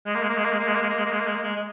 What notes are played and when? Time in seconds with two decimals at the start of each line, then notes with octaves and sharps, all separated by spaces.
0.06 G#3
0.15 A#3
0.23 G#3
0.29 A#3
0.37 G#3
0.44 A#3
0.52 G#3
0.59 A#3
0.67 G#3
0.75 A#3
0.82 G#3
0.90 A#3
0.98 G#3
1.05 A#3
1.12 G#3
1.19 A#3
1.27 G#3
1.35 A#3
1.43 G#3
1.56 G#3